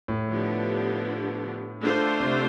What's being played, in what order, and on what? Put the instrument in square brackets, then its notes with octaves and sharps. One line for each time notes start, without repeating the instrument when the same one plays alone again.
[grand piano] A2
[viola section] D3 F3 B3 D4 G4
D3 A3 D4 F4 C5
[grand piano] C3